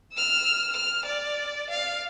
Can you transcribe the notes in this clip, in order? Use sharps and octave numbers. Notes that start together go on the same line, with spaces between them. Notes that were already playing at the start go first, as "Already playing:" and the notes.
E6 F6
F6
D5
F5